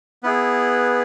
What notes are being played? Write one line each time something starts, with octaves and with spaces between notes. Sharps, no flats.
B3 E4 G#4 B4